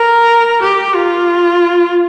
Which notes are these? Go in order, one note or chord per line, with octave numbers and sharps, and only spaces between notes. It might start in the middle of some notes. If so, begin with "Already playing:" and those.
Already playing: A#4
G4
F4